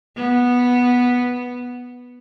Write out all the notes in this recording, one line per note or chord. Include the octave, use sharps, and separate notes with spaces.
B3